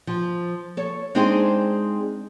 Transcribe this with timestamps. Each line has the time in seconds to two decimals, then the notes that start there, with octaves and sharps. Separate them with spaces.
0.07 F3
0.77 A4 C#5
1.15 G#3 C4 D4 D#4 G#4 C5